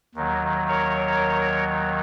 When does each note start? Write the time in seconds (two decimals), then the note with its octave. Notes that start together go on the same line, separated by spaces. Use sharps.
0.15 D#2 D#3 F#3
0.68 A#4 C#5